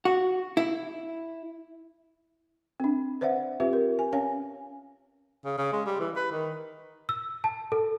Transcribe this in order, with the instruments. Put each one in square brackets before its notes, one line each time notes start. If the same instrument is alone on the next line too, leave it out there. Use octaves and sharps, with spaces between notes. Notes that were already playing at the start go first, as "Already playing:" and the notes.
[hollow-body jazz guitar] F#4
E4
[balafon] C4 D4
B4 C5 D5 E5 F#5
C4 F4 G4 B4 E5
A#4
G#5
C#4 C#5 F5 G#5
[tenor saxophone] C#3
C#3
G#3
G3
E3
B4
D#3
[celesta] E6
A5
A4